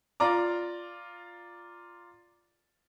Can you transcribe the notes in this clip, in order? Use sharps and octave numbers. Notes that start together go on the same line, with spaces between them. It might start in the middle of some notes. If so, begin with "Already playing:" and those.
F4 D5 A#5 D6